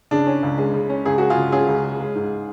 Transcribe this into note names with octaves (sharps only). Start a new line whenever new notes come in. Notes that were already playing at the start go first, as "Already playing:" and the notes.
C#3 D4
C#4
C#2
G#3
C#3
C#4
C#2 G#4
G#3 F#4
F4 G#4
C#3
C#4 F4 G#4
C#2
G#3
G#3
G#2